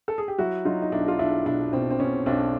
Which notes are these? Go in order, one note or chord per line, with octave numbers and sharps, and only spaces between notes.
A4
G#4
G4
F#3 E4 F#4
F#3 D#4 F4
D#4
B1 D4 E4
F4
B1 D4 E4
B2 D4 E4
B2 C4
C4
B2 C#4
B1 C4 D4